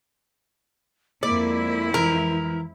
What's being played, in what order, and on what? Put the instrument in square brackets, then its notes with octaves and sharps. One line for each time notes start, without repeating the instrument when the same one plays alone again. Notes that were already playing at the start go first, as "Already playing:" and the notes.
[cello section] F2 G#3 E4 [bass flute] A#3 [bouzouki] D5
[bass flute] E3 [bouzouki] A#4